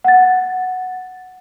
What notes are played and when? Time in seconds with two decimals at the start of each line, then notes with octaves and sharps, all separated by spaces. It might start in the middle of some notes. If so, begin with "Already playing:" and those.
0.04 F#5 A6